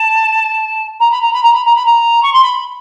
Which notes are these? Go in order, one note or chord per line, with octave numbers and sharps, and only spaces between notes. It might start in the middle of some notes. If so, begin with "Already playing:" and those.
Already playing: A5
A#5
B5
A#5
B5
A#5
B5
A#5
B5
A#5
C#6
C6
B5